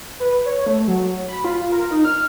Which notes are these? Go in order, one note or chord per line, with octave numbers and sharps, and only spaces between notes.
B4
C#5
A3
F#3
B5
F4
A#4
D#4
F6